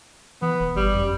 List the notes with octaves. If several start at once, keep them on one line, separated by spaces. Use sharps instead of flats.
E3 B3
E1
G1 G3
F#2